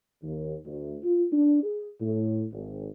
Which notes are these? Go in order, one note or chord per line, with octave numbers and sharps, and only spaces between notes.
D#2
D2
F4
D4
G#4
A2
G#1